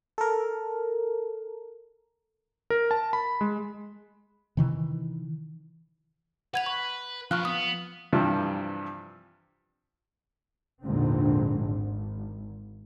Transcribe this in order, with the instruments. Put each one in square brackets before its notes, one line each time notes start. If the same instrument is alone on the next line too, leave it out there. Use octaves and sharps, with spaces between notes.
[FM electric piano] A4 A#4
[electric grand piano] A#4
A5
B5
G#3
[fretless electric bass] C3 D#3 E3
[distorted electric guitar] B4 [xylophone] F#5 G#6 F7
[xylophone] C#6
[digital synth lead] F3 [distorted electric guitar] C4 B4 [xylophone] C#6 F6 F#6
[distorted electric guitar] B3 [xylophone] D#6
[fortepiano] G2 C3 E3 F3 G3
[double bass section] A#1 E2 G#2 D3 C4
G#1